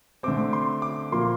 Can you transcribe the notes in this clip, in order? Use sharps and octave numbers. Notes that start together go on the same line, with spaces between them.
D3 A3 C4 D6
C6
D6
A#2 F3 A#3 C6